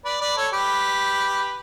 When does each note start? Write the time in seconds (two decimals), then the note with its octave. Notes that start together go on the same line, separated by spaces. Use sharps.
0.05 B4 D5
0.21 B4 D5
0.37 A4 C#5
0.53 G4 B4